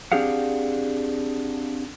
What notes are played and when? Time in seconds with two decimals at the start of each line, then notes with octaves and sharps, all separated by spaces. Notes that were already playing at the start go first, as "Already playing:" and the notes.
0.12 C4 D4 G4 G#4 F5 F#5